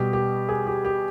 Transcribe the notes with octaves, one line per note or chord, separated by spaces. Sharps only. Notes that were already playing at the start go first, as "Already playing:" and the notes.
Already playing: B2 G3 B3 G4
G4
G#4
G4
G4